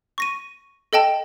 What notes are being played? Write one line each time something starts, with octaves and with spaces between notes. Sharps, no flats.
C#6 A#6 D#7
A4 D#5 G5 A5